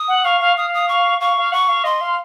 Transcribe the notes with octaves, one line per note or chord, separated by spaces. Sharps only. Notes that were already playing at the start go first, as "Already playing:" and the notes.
Already playing: D#6
F#5
F5 C#6
F5
F5 D#6
D#6
C#6
F5 C#6
F5
F#5 C#6
F5
D#5 C6
F5